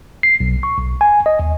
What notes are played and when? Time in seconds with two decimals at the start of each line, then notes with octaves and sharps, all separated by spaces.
0.23 C7
0.40 B1
0.63 C#6
0.78 B1
1.01 G#5
1.26 D#5
1.39 D#2